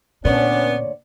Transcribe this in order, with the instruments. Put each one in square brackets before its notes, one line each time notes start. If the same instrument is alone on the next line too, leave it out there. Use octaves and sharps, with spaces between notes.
[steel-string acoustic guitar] D2 C#5 D5 [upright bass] A#2 [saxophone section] B3 [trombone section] C#4 D4